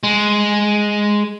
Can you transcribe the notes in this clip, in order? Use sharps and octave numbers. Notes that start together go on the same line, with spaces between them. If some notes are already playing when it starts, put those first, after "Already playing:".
G#3